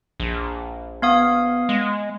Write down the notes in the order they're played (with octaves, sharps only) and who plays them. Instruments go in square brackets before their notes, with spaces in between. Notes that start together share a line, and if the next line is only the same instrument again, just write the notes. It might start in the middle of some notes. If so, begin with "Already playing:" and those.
[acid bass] A#1
[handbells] B3 F5 D#6
[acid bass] G#3